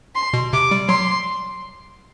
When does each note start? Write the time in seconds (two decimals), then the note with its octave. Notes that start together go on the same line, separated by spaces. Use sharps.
0.15 C6
0.33 B2
0.53 C3 D6
0.71 G3
0.89 F#3 C6